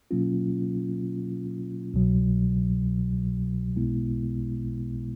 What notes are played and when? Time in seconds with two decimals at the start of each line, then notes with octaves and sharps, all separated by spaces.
0.11 B2 F#3 A#3 C#4 F4
1.94 C2 B2 F#3
3.76 B1 B2 G#3 B3 E4